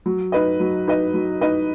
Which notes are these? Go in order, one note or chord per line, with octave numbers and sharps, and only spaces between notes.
F#3
D#4 B4 D#5
F#3
D#4 B4 D#5
F#3
D#4 B4 D#5